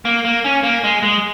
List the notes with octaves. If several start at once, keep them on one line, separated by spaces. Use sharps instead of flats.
A#3
A#3
C#4
A#3
G#3
G#3